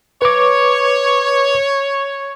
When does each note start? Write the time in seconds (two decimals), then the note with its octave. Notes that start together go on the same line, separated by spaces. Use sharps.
0.22 B4 C#5 D6